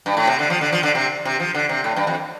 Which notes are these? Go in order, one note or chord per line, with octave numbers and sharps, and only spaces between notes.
G2
A2
C3
D3
F3
D3
F3
D3
C3
C3
F3
D3
C3
A2
G2
F2